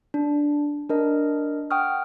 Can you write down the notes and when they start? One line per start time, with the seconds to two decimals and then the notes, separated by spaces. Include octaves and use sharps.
0.14 D4
0.90 D4 A#4 D#5
1.71 F#5 G5 C#6 D#6 F6